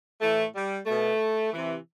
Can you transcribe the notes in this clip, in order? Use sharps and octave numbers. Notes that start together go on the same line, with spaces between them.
A2 E3 A3
G3
B2 A3
C3 E3